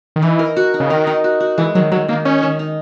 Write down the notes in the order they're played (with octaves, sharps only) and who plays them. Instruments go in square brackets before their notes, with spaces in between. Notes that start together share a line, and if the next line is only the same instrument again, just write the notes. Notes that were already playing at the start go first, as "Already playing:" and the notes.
[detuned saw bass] D#3
[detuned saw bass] E3 [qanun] D#4
[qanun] A#4
F#4
D#4
[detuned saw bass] C#3
[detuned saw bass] D#3 [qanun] A#4
[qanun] D#4
F#4
F#4
[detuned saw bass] E3 [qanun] G#3
[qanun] D#3 [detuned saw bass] F#3
[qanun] D#3 [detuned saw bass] F#3
[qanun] D#3 [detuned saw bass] A#3
[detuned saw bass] C#4 [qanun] D#4
[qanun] D#3
D#4